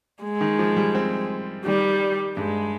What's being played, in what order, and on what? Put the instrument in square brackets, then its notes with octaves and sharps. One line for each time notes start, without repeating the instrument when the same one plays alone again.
[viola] G#3
[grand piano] D#3
F3
G3
C4
[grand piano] D#3 [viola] G3
[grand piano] G2 [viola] G#3